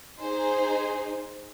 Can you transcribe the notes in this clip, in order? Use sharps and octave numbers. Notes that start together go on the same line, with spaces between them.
D#4 G#4 C5